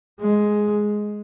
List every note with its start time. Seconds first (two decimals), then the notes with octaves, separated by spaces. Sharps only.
0.20 G#3